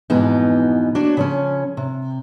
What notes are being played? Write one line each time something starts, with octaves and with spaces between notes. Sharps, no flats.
F2 G#2 B2 E3 B3 D#4
A#3 D4 F#4 C#5
C#3 F3 C#4
C3